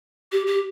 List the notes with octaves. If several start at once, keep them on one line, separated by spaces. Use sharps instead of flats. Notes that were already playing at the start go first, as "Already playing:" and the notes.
G4
G4